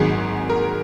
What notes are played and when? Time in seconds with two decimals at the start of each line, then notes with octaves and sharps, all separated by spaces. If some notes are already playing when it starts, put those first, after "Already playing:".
Already playing: G#1 G#2 F#3 G#4
0.50 A#4